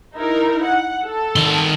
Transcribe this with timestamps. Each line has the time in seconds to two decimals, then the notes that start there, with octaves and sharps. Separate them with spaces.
0.15 D#4 E4 A#4
0.64 F#5
1.04 A4
1.36 D#3 C6